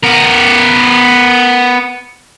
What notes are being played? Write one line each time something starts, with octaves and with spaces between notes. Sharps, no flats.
B3 A#4